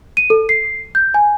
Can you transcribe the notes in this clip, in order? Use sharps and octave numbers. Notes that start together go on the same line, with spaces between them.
D#7
A4
C7
G6
G#5